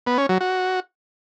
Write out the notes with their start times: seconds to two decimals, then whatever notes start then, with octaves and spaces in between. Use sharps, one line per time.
0.07 B3
0.18 C#4
0.29 F#3
0.41 F#4